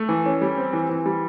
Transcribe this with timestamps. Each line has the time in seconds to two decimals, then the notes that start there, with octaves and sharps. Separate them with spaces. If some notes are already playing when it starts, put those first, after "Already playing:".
Already playing: A3
0.09 E3
0.26 C#4
0.42 G3
0.57 C4
0.73 E3
0.89 E3
1.06 G3